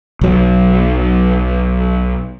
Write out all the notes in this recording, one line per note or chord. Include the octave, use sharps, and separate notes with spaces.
B1 F#3